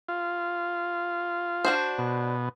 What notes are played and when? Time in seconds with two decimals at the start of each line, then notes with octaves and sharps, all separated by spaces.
0.08 F4
1.65 D4 F#4 C5
1.98 B2